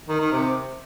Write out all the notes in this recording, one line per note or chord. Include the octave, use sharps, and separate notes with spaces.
D#3
D#3
C3